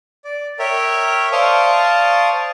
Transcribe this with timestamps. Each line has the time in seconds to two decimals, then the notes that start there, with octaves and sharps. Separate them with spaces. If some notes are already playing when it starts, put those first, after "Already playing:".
0.25 D5
0.59 A#4 C#5 E5 G5
1.32 C5 D5 F5 A5 C#6 D#6